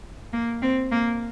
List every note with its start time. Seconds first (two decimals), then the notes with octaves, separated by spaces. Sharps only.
0.33 A#3
0.62 C4
0.92 A#3